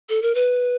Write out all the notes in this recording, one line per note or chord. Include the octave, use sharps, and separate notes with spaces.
A4
A#4
B4